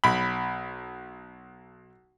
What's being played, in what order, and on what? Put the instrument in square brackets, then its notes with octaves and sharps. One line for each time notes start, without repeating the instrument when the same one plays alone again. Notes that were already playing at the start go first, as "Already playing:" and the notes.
[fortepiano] B1 B5